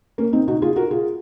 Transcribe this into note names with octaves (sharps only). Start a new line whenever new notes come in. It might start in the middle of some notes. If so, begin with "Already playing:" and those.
A#3 C#4
C4 D#4
D#4 F#4
F4 G#4
F#4 A#4
F4 G#4